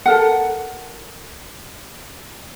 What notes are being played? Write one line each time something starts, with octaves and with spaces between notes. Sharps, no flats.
A4 A#4 F#5